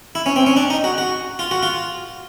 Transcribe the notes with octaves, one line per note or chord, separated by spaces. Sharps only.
E4
C#4
C4
C#4
D4
D#4
F#4
F#4
F4
F#4
F4